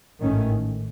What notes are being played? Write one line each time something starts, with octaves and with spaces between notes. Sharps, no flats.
A1 G#2 D#3 A3 C#4